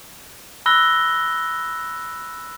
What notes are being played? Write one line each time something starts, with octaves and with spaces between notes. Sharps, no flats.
B5 E6 F#6 A#6 G7